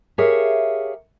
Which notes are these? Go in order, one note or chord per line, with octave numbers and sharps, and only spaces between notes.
G4 G#4 A#4 C#5 E5 F5